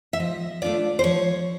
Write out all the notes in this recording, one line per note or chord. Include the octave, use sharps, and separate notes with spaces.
E5
F3 D#5
A3 D4 F4 D5
C5
F3 C#5